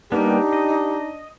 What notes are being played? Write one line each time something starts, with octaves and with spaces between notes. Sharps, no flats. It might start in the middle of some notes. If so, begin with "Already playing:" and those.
G3 A#3 B3 D4 D#4 G4
D#5